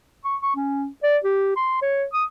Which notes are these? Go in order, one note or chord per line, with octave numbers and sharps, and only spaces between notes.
C#6
C#6
C#4
D5
G4
C6
C#5
D#6